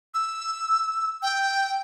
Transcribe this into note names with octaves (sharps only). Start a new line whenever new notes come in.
E6
G5